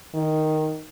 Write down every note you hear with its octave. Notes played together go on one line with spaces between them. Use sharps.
D#3